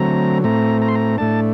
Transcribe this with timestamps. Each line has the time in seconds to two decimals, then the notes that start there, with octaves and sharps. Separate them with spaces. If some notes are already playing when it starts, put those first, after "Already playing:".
Already playing: D3 F#3 A3 C4 A#5
0.44 A2 A3 C4 A#5
0.82 A#5
0.88 C6
0.95 A#5
1.18 A2 A3 D4 A5